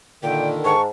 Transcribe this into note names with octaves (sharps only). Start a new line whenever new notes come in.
A#2 D3 D#3 G5
G#2 A5 C#6